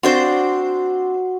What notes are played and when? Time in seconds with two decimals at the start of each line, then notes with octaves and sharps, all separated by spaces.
0.03 C4 D4 F#4 C5